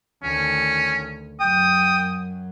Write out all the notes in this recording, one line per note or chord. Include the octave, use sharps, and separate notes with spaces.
D2 D#3 C#4
F#2 F#3 G5 D#6